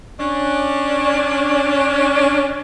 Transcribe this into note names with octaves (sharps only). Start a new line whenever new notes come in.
C#4 D4